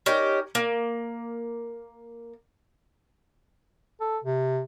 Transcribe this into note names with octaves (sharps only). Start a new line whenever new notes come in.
C#4 D#4 G4 A#4
A#3
A4
C3